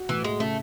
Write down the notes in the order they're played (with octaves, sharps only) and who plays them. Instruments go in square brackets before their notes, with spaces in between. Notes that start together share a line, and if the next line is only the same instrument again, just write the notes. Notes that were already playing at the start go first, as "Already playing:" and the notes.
Already playing: [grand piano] F#4
[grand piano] A2 [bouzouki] E3
[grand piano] A2 [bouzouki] G#3
[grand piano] C#3 [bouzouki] A3